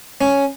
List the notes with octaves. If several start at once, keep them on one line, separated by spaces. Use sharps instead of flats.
C#4